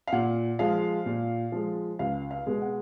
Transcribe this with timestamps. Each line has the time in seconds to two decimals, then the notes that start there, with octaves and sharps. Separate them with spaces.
0.07 F5
0.12 A#2 F#5
0.59 F3 G#3 F5
1.06 A#2
1.52 F3 G#3
1.99 C#2 F5
2.31 F5
2.46 B2 G#3
2.62 F#5